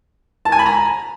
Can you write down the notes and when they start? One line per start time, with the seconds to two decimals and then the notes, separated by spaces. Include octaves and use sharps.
0.45 A5
0.52 G#5
0.59 B5
0.66 A#5